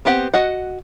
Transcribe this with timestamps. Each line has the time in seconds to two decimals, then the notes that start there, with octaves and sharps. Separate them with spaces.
0.05 B3 C4 G4 F#5
0.34 F#4 D#5 F#5